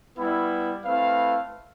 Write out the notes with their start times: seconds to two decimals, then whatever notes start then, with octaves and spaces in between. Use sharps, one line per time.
0.17 G3 B3 E4
0.84 A3 C4 E4 B4 F5